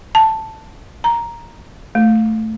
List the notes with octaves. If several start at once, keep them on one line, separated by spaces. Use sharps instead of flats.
A5
A#5
A3